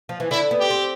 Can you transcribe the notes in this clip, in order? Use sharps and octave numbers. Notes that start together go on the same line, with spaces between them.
F3
E3
D3 E4
B3
G4
C4